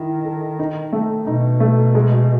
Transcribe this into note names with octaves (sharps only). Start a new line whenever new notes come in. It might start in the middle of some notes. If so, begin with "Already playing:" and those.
Already playing: D#3 E4
A4
D#4
A3
B2 D#4
A3
G#3